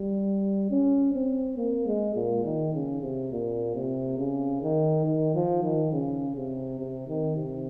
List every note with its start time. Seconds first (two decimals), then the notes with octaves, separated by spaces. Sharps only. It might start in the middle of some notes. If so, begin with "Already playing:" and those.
Already playing: G3
0.71 C#4
1.14 C4
1.57 A#3
1.87 G#3
2.16 A#2
2.45 D#3
2.74 C#3
3.02 C3
3.32 A#2
3.75 C3
4.18 C#3
4.62 D#3
5.06 D#3
5.35 F3
5.63 D#3
5.93 C#3
6.36 C3
6.79 C3
7.08 D#3
7.37 C3